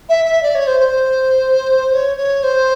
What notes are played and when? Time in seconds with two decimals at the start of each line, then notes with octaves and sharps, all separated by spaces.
0.09 E5
0.25 E5
0.42 D5
0.54 C#5
0.67 C5
0.80 C5
1.93 C#5
2.17 C#5
2.43 C5